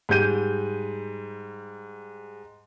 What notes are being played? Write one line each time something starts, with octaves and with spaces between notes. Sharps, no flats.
G#2 G3 G6 D#7